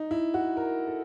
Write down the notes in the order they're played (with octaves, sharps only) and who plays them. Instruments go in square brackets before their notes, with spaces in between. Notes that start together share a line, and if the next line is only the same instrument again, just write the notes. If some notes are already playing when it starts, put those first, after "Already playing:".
Already playing: [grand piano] D#4
E4
F#4
A#4
A4